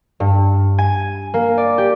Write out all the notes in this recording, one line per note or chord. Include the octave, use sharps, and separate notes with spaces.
G2
G#5
A#3
D5
G4